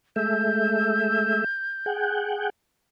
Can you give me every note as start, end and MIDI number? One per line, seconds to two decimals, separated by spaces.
0.16 1.44 56
0.16 1.44 57
0.16 1.44 76
0.16 2.06 91
1.86 2.50 68
1.86 2.50 78
1.86 2.50 79